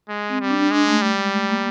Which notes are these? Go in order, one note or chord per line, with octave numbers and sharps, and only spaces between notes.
G#3
C4
G3
D4
G#3 D4
A3
G3
G#3
A3
A#3